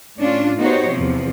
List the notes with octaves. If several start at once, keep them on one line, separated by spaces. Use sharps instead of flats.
A2 C#4 D4 F4
B3 D#4 F#4 G4 C5 C#5
E2 C3 F3